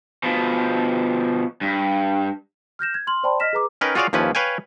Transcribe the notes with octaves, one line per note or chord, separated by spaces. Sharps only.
B2 F3
G2
F6 G6 A#6 E7
G#6
C6 F6 F#7
C5 D5 G5 A5 B5 C6
D#5 F6 A#6 B6 E7
G#4 B4 A#5 D6
C#4 D#4 A#4 B4 G5
F4 F#4 G#4 C#5 D5 F5
D#2 F3 C#4 E4 B4
B4 C#5 F5 G5 G#5